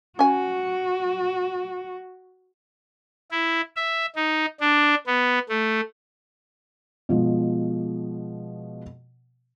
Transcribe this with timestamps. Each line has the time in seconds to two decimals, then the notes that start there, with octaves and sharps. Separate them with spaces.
0.19 C#4 F#4 G#5
3.31 E4
3.76 E5
4.16 D#4
4.60 D4
5.07 B3
5.49 A3
7.09 B2 F3 G#3